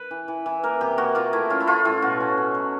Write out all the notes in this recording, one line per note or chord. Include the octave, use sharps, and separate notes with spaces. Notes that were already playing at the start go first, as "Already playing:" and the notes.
Already playing: B4
E3
E3
E3
A#3 A#4
C3 G4
A#3 F#4
A#3 F4
A3 E4
C#4 F4
E4
A3 F4
A2 F4
B2 F#4
C#4
B2
F#3